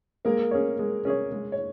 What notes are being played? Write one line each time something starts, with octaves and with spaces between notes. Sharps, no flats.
G#3 A#3 A#4
C#4 G#4 C#5
G#3
C#4 G#4 C#5
G#3
C#5